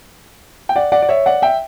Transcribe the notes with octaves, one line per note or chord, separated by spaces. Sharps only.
G5
D5 F#5
D5 F#5
D5
C#5 E5
D5 F#5
E5 G5